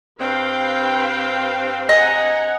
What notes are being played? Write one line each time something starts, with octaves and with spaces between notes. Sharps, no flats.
G2 C4 B4 F5 G5
D#5 F#5 G#5 A#5